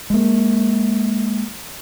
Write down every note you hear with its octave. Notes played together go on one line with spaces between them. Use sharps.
G#3 A#3